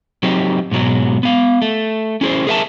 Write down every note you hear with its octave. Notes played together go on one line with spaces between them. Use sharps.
F#3 C4 D#4 G4
G#2 B2 F#3 G#3
B3 F5
A3
C#4 E4 G#4 C5
G#4 A#4 E5 F#5 A5